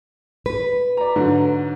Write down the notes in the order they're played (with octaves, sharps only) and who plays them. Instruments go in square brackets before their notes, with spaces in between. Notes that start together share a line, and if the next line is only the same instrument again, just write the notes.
[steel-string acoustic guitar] B4
[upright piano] D5 A#5
G#2 D3 F#3